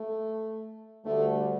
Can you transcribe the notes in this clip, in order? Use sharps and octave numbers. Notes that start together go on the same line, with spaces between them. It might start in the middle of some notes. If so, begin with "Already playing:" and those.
Already playing: A3
D2 D3 G3 A3